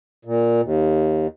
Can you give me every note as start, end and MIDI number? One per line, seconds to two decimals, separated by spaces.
0.25 0.61 46
0.63 1.27 39